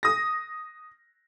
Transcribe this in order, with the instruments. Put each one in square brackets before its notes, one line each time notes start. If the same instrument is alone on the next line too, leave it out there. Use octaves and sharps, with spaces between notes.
[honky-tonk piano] D#6 A#6